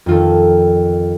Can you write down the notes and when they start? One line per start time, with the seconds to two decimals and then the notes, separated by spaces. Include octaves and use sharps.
0.06 F2 D#3 F4 A4